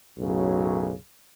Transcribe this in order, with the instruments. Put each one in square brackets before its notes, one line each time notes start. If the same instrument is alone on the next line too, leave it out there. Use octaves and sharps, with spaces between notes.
[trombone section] B1 F#2 A2 C#3 F#3